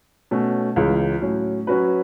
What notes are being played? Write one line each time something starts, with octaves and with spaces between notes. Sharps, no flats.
B2 A3 C#4
C#2 C#3 E3
A2 F#3 C#4
F#3 C#4 F#4 B4